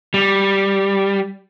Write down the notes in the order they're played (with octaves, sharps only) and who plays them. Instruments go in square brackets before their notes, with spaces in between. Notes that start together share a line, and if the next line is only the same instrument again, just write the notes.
[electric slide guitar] G3